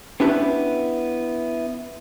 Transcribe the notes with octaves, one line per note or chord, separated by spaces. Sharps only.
B3 C#4 D4 E4 G4 B4